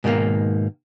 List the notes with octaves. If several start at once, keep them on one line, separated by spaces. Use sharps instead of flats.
G#2 B2 D#3 G#3 A#3